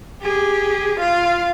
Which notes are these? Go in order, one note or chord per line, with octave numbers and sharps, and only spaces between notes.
G4 G#4
F4 F5